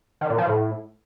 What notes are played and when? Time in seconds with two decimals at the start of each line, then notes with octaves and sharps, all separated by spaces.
0.21 D#3
0.30 A#2
0.38 F3
0.47 A2